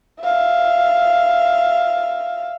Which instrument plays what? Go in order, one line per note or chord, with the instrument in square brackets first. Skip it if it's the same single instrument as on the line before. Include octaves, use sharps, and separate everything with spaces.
[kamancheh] E5 F5